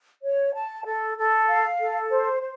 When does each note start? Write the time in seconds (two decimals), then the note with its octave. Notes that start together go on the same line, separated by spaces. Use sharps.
0.22 C#5
0.54 A5
0.84 A4
1.16 A4
1.48 F5
1.79 A4
2.09 C5
2.41 C5